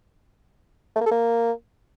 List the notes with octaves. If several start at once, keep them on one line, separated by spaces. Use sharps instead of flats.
A3
A#3
A4
A#3